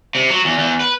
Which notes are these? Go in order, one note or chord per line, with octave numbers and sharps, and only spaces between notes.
C3
F#3
E2
E2
B4